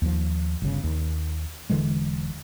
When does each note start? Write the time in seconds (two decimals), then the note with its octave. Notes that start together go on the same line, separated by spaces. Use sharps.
0.02 D#2 F3
0.62 G1 C#3
0.83 D#2
1.70 E1 D3 E3 G#3